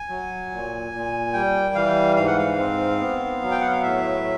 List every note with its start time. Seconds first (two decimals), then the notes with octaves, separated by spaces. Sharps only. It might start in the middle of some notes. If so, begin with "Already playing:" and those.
Already playing: G#5
0.09 F#3
0.51 A#2
0.92 A#2
1.33 G3 G5
1.75 E3 F5
2.16 G#2 F5
2.27 F#5
2.38 F5
2.58 C4
3.00 B3
3.41 F#3
3.51 G5
3.61 F#5
3.72 F5
3.82 A2 E5